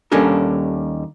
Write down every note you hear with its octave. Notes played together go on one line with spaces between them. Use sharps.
D#2 G3 C#4 D4 A4 A#4